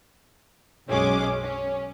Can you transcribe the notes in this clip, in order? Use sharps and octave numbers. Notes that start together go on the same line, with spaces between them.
B1 F#2 G#3 C#4 G#4 D6
C#4